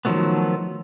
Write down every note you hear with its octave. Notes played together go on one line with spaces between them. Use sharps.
D#3 F3 F#3 A3 B3